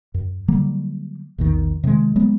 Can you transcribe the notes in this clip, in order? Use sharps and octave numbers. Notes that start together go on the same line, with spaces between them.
F#2
D3 F#3 G3 A#3
A#1 E2 D#3
C3 D#3 F3 G#3
F#3 G#3 A#3 B3